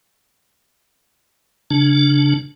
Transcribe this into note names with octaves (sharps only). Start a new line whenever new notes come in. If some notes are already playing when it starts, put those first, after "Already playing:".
C#3 D4